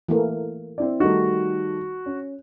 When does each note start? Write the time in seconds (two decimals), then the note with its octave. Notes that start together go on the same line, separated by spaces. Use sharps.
0.08 E3 A3 A#3
0.78 C4 E4 D5
1.00 D#3 G3 A3 D#4 F#4
2.06 C#4